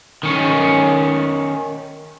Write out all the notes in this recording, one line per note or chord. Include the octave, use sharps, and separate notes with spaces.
D#3 C#4